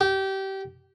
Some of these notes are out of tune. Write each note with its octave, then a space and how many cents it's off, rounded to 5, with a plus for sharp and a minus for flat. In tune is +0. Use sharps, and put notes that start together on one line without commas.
G4 -25